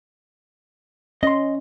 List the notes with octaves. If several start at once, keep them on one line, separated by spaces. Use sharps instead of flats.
C#4 D#5 C6